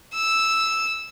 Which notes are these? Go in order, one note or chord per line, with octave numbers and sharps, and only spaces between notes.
E6